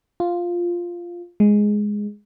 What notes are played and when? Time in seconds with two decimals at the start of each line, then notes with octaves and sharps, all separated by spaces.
0.20 F4
1.40 G#3